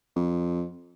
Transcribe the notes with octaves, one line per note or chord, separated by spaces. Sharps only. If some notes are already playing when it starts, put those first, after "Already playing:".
F2